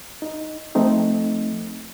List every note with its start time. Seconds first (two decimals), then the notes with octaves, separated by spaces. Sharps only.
0.22 D#4
0.75 F3 A3 C4 D#4